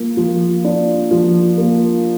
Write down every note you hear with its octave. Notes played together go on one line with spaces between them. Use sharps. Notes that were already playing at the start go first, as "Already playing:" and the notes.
Already playing: F3 A#3
F3
D4
F3
A#3